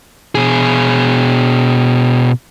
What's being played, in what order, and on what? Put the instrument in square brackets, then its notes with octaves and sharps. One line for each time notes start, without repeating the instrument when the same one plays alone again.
[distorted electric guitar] B2 G#4